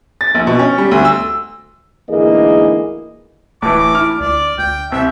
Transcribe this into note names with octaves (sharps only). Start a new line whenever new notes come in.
A6
A#1
B2
C#4
G3
D2
E6
D2 G#2 E3 A#3 G#4 D#5
D1 A2 E3 D6
E4 F6
D2 D5
D2 G5
C2 E5